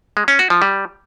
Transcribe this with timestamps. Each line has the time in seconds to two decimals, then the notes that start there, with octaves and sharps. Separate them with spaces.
0.17 G#3
0.28 C#4
0.39 F#4
0.50 F3
0.62 G3